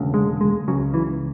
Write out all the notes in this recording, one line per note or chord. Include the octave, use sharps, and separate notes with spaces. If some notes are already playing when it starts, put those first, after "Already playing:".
Already playing: E1 D2 C#3
G#3
G#3
C#2 C#3 F#3
E3